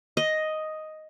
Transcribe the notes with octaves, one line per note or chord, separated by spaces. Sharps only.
D#5